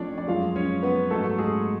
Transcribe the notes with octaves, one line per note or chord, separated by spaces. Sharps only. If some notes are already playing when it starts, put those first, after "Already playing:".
Already playing: F2 F3 A3 C#4 D4 C#5 D5
D5
F#2 F3 G#3 F4 F5
C#4 C#5
B3 B4
G#2 F#3 A3 A4
G#3 G#4